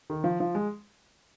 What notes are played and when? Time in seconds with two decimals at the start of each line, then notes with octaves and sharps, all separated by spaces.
0.10 D#3
0.24 F3
0.40 F3
0.55 G#3